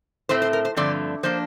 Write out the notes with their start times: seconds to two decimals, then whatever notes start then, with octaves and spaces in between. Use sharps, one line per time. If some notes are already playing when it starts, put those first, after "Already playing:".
0.29 A2 A3 C4 C5
0.42 C5
0.53 A#4
0.65 C5
0.77 G2 D3 F3 A3 C4 D5
1.23 F3 A#3 D4 C5